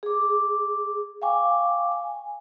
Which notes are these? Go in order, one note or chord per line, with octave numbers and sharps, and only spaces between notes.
G#4 D6
F5 G5 G#5 C#6 D6
G#5